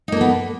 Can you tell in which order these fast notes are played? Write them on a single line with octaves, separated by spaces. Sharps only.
D#4 A#3 A4 B3